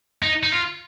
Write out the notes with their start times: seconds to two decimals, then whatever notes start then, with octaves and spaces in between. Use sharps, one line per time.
0.22 D#4
0.43 D#4
0.52 F4